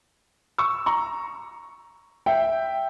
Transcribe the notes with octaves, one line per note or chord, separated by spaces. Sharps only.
C#6 E6
A#5 C#6
E5 G5